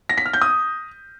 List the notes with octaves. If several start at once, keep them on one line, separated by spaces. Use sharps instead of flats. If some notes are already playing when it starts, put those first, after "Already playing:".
A#6
B6
F6
G6
D#6